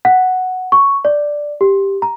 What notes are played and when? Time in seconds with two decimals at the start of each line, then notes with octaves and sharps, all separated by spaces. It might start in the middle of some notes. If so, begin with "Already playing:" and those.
0.05 F#5
0.72 C#6
1.05 D5
1.61 G4
2.02 A#5